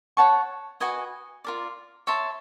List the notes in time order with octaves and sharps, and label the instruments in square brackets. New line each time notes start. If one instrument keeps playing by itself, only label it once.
[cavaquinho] C#5 F#5 A5 C#6
F#4 B4 D#5 G#5
F4 A#4 D5
C#5 E5 A5 C6